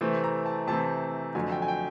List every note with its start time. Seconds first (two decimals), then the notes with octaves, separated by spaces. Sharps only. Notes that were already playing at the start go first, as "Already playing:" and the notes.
0.01 C3 E3 A3 C4
0.24 A#5
0.46 A5
0.67 C3 E3 A3 C4 A5
1.35 F2 D3 F#3 A3 G#5
1.52 G5
1.62 G#5
1.68 G5